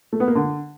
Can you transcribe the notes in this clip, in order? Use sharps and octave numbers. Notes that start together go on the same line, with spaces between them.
A3
B3
A#3
D3